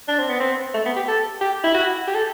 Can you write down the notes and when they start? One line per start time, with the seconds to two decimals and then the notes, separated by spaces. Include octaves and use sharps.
0.08 D4
0.18 C4
0.30 B3
0.40 C4
0.74 A3
0.86 B3
0.96 G4
1.08 A4
1.41 G4
1.64 E4
1.75 F#4
2.08 G4
2.15 A4